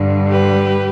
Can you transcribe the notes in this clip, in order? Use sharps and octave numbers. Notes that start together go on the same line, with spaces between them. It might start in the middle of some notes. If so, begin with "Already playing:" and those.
Already playing: G2 D3 G3
G4 B4